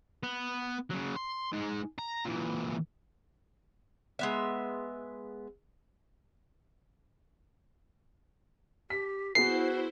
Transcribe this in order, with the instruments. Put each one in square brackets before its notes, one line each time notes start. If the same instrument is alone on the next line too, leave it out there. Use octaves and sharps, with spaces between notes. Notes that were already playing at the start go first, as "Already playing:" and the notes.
[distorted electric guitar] B3
C#3 F#3
C6
G#2 G#3
A#5
A#2 E3
[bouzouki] G#3 B3 E5
[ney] G4 [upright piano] B6
[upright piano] B3 G#4 B4 [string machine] E4 C5 [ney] F#4 [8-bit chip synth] C7